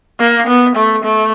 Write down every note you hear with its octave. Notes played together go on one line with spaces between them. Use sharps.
A#3
B3
A3
A3